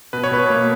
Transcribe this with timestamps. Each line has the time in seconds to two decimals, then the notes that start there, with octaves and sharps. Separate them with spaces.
0.13 B2 B4
0.24 C#5
0.32 B2 B4
0.50 A#3